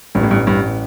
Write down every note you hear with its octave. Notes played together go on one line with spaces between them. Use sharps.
A1 G2
A2
G2
A1 G2